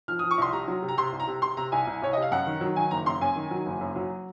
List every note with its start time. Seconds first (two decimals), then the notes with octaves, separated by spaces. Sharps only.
0.08 F3 F6
0.19 D#6
0.23 F3
0.31 C#6
0.37 C2 C6
0.53 C3 A#5
0.68 F#3
0.82 C3
0.89 A#5
0.97 C3 C6
1.12 C2
1.20 A#5
1.27 C3
1.42 C3 C6
1.57 C3 A#5
1.72 C2 G#5
1.87 C2
2.02 C2 C#5
2.13 C3 D#5
2.22 F5
2.31 F#2 F#5
2.47 D#3
2.61 F#3
2.76 D#3 G#5
2.91 F#1 A#5
3.06 F#2 C6
3.21 F#2 G#5
3.36 D#3
3.51 F#3
3.66 F#1
3.81 F#2
3.95 F#3